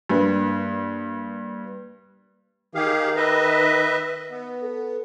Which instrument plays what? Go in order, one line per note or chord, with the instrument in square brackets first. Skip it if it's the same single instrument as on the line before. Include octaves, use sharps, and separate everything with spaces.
[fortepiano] G2 [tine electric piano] A#3 B4
[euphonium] D#3 [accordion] G4 G#4 F5
[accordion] B4 D#5 E5
B3
[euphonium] A4